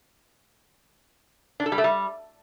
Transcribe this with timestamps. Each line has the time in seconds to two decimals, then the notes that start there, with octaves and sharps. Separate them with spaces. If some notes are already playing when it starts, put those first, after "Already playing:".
1.60 D4
1.66 A4
1.72 G3
1.78 A3
1.84 G3